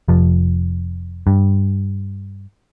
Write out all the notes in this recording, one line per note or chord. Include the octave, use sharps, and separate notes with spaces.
F1 F3
G2